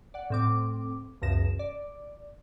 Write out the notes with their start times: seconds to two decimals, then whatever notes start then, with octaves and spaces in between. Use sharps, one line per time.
0.14 D5 F#5
0.30 A2 C4 D6
1.22 C#2 F#2 B2 A#6 E7
1.59 D5